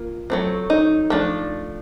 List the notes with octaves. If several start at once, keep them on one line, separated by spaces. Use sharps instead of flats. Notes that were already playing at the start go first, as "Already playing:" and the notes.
Already playing: A#3 F4
F#3 A3 C4
D#4
F3 A3 D4